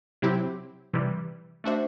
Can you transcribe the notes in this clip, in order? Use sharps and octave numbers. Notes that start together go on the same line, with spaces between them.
C3 F#3 C4 E4 G4
C3 E3 G3
A3 D4 F#4 C5 E5